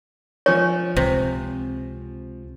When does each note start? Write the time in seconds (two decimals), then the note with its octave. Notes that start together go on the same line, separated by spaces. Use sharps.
0.46 F3 C#5 G#5 C#6
0.97 C#2 C3 C4